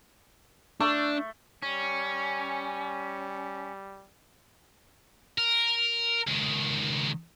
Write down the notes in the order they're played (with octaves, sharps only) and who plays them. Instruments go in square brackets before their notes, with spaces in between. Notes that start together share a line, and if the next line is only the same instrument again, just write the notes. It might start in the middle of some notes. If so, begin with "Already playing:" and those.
[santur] A3 [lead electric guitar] D4
[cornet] G3 [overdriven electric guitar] C#4
[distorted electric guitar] A#4
C#2 D#3